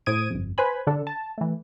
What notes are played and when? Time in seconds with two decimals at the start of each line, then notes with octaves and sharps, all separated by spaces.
0.06 A2 C5 D#6 G#6 D7 D#7
0.30 G1 F2
0.58 B4 C5 G#5 B5
0.87 D3 D4 A4
1.07 A5
1.38 E3 A3